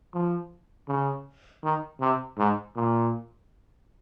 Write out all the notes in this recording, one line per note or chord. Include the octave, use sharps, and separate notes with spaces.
F3
C#3
D#3
C3
G#2
A#2